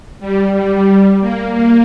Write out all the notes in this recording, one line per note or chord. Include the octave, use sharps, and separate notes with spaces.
G3
G3
A#3
A#3